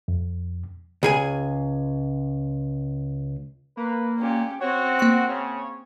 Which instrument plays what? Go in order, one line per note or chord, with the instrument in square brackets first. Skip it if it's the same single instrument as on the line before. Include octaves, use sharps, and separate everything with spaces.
[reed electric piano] F2
[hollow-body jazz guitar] C#2 G#4 G#5
[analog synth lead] A#3 [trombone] B4
[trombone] A#2 [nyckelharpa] C#4 G4
[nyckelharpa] C4 [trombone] F#4 [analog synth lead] C#5
[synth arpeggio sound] A#3 F#5
[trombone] C#3 [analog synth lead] C#5